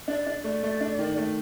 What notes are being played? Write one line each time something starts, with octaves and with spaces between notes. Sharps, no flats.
D4 D5
D4
A3 D5
A3
D4
D#3
A3